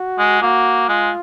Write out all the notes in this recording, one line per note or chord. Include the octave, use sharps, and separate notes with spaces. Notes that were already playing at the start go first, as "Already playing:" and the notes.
Already playing: F#4
G#3
A#3 F#4
G#3 F4